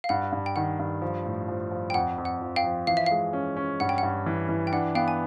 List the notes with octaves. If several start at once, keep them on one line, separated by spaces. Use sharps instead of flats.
F5
G2 F#5
G2
G5
D#3 F#5
G2
F3
A2
F3
F3
G5
F2 F#5
F2
F#5
F3
F5 G5
F3
E3 F5
E5
G#3 F5
C#4
C#4
G2 F#5
G5
G2 F#5
E3
E3
G5
D4 F#5
B3 F5 G5
G#5